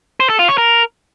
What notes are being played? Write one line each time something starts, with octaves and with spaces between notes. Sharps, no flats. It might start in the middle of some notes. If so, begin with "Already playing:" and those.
C5
A4
F4
C#5
A#4